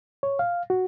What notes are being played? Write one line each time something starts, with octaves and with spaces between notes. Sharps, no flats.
C#5
F5
F#4